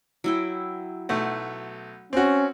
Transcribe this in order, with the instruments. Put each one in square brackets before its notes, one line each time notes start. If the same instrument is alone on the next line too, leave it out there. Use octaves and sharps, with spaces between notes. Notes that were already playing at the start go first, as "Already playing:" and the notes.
[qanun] F#3 E4 G5
[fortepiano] B1 A3 [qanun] F#5
[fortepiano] C4 F#4 [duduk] C#4